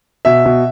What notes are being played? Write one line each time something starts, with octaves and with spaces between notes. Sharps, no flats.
B2 E5
B2